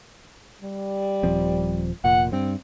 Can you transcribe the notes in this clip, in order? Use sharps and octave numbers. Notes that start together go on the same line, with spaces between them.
G3
D#1 F3 C4
F1 A#2 F#5
G2 C4